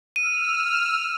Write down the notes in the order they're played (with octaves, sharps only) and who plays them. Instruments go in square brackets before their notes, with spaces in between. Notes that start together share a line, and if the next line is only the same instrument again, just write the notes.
[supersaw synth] E6 F6 [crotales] D#7